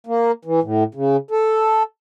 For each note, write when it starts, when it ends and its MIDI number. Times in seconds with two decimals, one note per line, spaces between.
0.07 0.32 58
0.45 0.60 52
0.63 0.84 45
0.94 1.17 49
1.31 1.83 69